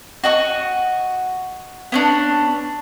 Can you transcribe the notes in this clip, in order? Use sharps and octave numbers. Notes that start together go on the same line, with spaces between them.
F#4 D#5 C#6
B3 C#4 D4